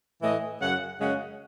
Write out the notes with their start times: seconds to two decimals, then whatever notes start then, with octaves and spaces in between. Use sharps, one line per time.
0.22 A2 E3 A3 D#5
0.61 F#2 C#3 F#3 F#5
1.00 F#2 C#3 G#3 C#4 F#5